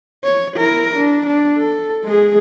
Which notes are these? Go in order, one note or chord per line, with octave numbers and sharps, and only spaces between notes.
C#5
E4 A#4
D4
D4
A4
G#3 G#4